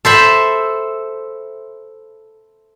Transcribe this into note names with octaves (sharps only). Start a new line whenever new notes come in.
A4 C5 E5 B5